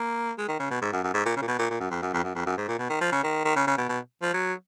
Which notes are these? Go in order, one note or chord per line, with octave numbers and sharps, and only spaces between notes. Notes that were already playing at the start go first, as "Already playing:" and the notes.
Already playing: A#3
G#3
D#3
C#3
B2
G#2
F#2
F#2
G#2
A#2
C#3
A#2
B2
A#2
A#2
F#2
F2
F#2
F2
F#2
F2
F#2
G#2
A#2
B2
D#3
F3
C#3
D#3
D#3
C#3
C#3
B2
B2
F3
F#3